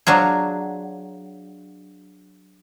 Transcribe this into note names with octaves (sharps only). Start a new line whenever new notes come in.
F#3 D4 F4 G#4